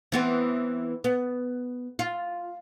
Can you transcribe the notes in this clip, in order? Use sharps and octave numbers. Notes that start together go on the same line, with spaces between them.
E3 B3 C4
B3
F4